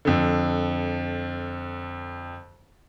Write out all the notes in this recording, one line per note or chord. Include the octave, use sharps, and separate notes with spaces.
F2 D3